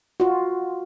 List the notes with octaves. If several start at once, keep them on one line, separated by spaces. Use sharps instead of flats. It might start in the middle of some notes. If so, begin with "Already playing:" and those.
F4 F#4